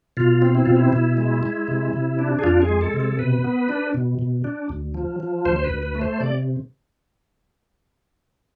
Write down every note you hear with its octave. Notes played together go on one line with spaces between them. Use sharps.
B2 F4
C4
E4
B2 F4
E4
B2 E4
G#3
G#3
C3
C3
D4
G#4
F2 F4
G#4
G#3
A4
C3
A4
B2 B4
B3
D4
B2
B2
D4
D2
F3
F3
D2 C5
C5
B4
D2
B4
A3
C5
C3 D5